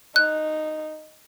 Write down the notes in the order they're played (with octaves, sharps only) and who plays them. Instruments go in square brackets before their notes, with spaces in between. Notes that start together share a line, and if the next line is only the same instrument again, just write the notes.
[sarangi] D#4 [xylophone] F#6